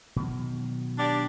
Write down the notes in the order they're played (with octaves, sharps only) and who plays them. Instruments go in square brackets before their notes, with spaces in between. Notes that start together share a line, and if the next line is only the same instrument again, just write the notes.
[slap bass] B2 D#3 F#3
[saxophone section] D4 G4 D5